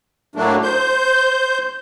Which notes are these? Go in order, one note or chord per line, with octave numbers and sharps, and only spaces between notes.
A2 F#3 A3 A#3 D4
C5 G6